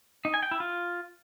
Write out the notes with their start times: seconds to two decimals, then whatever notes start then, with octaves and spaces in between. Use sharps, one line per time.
0.25 D#4
0.34 G#5
0.43 G5
0.51 E4
0.60 F4